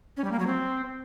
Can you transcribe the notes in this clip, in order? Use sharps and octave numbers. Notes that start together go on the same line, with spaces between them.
C#4
G3
A#3
F#3
C4